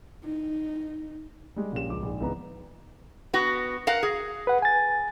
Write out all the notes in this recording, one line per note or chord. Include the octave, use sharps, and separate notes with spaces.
D#4
G3 G#3
A#1 A#2 C#4 G4 E7
C#2 F3 D6
A#1 G#2
C#2 D#3 E3 B3 B4 A#5
B3 F#4
A#4 F5 F#5
G#4
B4 F#5
G#5 A6